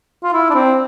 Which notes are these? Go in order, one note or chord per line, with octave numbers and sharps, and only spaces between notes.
F4
E4
D4
C4